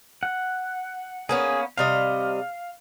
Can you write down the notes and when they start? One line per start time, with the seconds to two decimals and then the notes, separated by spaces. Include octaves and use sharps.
0.23 F#5
1.29 A#3 B3 C#4 G#4
1.78 C3 G3 D#5 F5